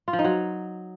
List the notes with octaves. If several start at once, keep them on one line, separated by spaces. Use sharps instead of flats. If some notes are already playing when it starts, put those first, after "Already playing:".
F4
F3
D#4
F#3